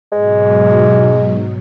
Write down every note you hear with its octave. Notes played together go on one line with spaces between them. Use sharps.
G#2 B2 F#3 G#3